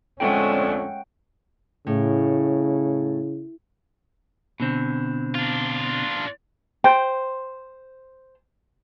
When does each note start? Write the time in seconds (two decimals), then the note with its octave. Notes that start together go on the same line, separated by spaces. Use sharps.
0.20 F2 D3 G#3 A3 C#4 F#5 G5
1.87 A2 C#3
4.60 B2 D3 C4
5.35 D4 F4
6.84 C5 G5